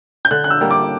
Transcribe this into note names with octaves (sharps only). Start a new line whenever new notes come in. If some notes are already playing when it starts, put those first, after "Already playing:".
G6
D3 F#6
F#6
E6
G3 A#3 D4
D6